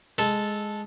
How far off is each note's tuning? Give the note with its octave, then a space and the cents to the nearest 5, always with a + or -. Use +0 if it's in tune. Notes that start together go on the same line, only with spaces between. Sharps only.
G#3 +0 A4 -10